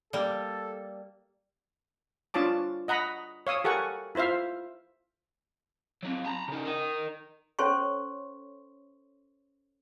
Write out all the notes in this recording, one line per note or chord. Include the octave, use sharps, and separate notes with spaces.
G3 A#3 A4
D4 F4 C#5 A5 D6
D#5 F#5 A#5 B5
C#5 F5 D#6 E6
G4 A4 A#4 F#5 G#5 C#6
E4 F4 C5 E5 F5
F#3 C4
A5 A#5
C#3 D#4
A#4 D#5
C#4 A4 C5 C#5 C6 C#6